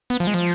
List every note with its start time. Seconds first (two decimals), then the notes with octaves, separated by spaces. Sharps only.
0.10 B3
0.20 F3
0.27 G#3
0.34 F3